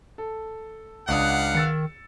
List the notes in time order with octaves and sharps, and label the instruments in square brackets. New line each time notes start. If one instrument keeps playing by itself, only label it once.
[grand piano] A4
[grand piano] C#2 D4 D#6 [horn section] B4 F5 F#5
[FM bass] D#3 [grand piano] E6 A6 C#7